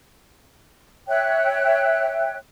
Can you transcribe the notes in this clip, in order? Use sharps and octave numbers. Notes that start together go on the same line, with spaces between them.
C#5 E5 G5 F#6